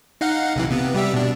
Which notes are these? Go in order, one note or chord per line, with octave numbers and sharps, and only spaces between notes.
D#4 F5 F#5
B1 C3 E3
C3 B3
G3 G4 E5
B2 D4